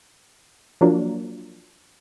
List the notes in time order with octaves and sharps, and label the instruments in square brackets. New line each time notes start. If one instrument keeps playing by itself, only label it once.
[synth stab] F3 F#3 A#3 D4